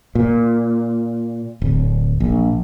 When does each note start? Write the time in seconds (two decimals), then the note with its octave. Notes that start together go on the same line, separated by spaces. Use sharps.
0.15 A#2
1.62 D1
2.20 A#1